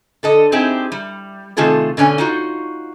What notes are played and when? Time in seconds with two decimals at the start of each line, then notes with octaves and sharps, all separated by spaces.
0.23 D3 A4 D#5
0.52 C4 D#4 E4 G4 G#4
0.92 G3
1.57 C3 D#3 A3 F4 G#4 A4
1.97 B2 D3 C#4 G#5
2.18 D#4 F4 F#4